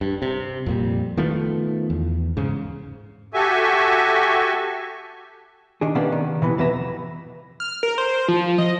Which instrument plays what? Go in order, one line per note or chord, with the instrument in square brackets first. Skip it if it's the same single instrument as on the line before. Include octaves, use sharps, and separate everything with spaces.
[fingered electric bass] G2
C3
F2 A#2 G3
D#3 F3 A3 B3
E2
G#2 C#3
[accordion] F#4 G4 A4 E5 G#5 C#6
[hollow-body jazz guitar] D#3 D4 G#4
C3 A#3 B3 C#4 D4
D#3
C3 E3 B3
F2 B2 E3 B4 E5 A#5
[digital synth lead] F6
A#4
C5
F3
D#5